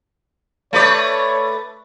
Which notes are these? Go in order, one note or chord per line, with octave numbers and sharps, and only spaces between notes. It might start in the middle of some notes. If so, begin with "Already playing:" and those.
A3 B4 C#5 D5